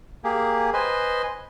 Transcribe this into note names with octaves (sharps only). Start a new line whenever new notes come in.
A#3 G4 G#4
B4 C5 D#5 G#5